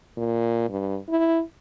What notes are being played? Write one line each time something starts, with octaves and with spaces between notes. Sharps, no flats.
A#2
G2
E4